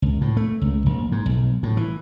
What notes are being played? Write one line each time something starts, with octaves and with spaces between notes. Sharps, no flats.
C#2
A2
A3
C#2
A#1
G#2
B1
A2
E3